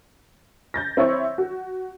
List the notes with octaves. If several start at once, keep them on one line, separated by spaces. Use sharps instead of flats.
G6 A6 A#6
C4 E4 C#5 C#6
F#4